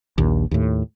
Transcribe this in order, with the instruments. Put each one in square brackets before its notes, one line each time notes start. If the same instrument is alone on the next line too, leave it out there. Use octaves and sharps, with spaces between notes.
[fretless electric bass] A#1 D#2
D#2 A2